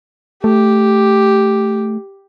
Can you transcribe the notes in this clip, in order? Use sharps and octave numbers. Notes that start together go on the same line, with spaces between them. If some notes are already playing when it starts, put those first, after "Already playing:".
A3 G4